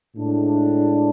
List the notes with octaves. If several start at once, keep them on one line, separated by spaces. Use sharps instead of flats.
A2 G#3 D4